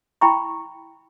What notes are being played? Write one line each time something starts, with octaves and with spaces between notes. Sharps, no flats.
E4 G5 A#5 B5 C#6